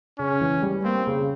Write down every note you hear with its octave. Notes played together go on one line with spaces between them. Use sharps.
C#3 C#4
E3
G3
A#3 C4
C#3